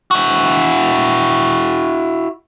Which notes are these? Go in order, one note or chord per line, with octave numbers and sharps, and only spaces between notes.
E4 F#4